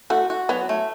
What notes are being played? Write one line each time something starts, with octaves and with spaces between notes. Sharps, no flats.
A3 F#4
F#4
F#3 B3
A3